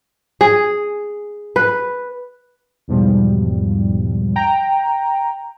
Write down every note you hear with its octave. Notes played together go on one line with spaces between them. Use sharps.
G#4
B4
E2 G#2 B2 F3 G3
G5 A#5